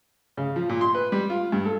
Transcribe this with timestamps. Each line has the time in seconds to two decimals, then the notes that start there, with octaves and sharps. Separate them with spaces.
0.37 C#3
0.56 F3
0.69 A#2
0.81 C6
0.95 B4
1.12 G3
1.30 F4
1.52 G2
1.65 A4